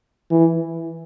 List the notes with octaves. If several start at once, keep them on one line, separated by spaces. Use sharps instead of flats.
E3